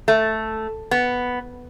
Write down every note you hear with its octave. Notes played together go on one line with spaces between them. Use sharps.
A3
B3